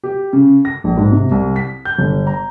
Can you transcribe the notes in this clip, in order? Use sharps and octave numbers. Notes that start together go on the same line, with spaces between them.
G4
C#3
A#6
A#1
G#2
C3
C2
B6
G6
G1
A#5